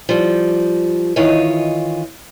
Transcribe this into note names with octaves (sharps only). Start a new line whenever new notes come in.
F3 G3
D#3 E3 F4 C#5 D#5